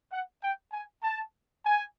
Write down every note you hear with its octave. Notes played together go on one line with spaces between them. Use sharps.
F#5
G5
G#5
A5
G#5